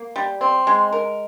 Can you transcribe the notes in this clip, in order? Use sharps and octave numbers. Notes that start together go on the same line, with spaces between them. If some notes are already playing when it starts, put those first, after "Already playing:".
Already playing: A#3
G3
C4
G#3
A#4